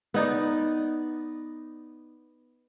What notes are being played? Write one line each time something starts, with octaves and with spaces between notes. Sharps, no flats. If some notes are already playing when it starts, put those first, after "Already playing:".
B3 D#4 D5